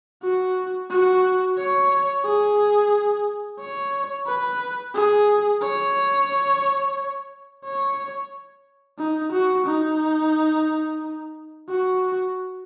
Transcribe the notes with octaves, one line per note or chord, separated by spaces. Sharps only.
F#4
F#4
C#5
G#4
C#5
B4
G#4
C#5
C#5
D#4
F#4
D#4
F#4